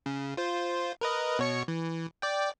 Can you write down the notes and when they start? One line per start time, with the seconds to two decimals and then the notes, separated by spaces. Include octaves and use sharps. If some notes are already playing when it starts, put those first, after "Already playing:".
0.06 C#3
0.37 F4 C5
1.01 A#4 B4 D#5
1.39 B2 C#5 C#7
1.68 E3
2.22 D5 G5